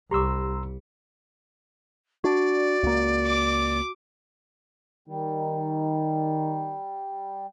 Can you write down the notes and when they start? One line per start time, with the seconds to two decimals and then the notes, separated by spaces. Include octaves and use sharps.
0.11 C2 G4 A#5 C6 D6 E6
2.24 D4 F#4 D5
2.83 C#2 A#3
3.27 D6
5.08 D#3 G3